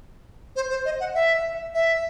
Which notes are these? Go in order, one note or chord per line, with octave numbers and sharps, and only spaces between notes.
C5
C5
D#5
F#5
E5
E5